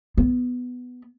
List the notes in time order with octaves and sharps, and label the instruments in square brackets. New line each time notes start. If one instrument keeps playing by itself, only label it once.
[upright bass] B3